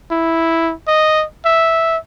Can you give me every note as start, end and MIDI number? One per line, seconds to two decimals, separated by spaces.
0.11 0.73 64
0.88 1.25 75
1.45 1.98 76